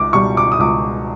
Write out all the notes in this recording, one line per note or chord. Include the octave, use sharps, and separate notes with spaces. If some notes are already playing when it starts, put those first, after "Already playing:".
Already playing: C#2 D6
B2 G3 C#6
D6
D#6
C#2 D6